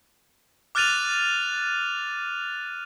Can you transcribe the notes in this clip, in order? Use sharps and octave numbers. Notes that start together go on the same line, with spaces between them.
D6 F6 F#6 A6 D#7 F7